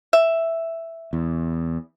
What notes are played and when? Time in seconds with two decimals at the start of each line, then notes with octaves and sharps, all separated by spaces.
0.13 E5
1.13 E2